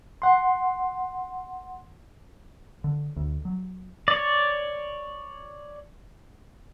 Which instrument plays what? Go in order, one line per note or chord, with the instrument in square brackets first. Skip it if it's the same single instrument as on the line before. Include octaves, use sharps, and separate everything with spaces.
[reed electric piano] F#5 C6
[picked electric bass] D3
D2
F#3
[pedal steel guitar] C#5 D5